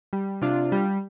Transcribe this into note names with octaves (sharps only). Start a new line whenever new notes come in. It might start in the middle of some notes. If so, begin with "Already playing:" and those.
G3
C3 D4 F4
G3